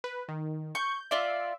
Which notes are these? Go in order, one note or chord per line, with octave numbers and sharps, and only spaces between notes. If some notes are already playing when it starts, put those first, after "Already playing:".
B4
D#3
C#6 G6
F4 D5 E5